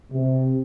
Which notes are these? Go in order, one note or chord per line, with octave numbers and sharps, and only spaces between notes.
C3